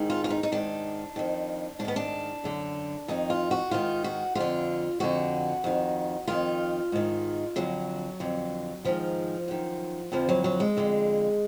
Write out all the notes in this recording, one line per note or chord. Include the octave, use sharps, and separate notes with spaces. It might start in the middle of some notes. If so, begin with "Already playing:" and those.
Already playing: G#2 D#3
F4
F4
D#4
D#4
G#2 D#3 D4
F2 D#3
G#2 D4
D#3 B3
D4
F#2 D3
F2 D#3 D#4
F4
F#4
G#2 D#3 F4
F#4
F2 D3 F4
F2 D3 F#4
F2 D#3
F2 D#3 F4
G#2 D#3
F2 D3 F#3
F2 D3
G#2 D#3 F3
F#2 D#3
F2 D3 F3
F#3
F#3
G#3
F2 D3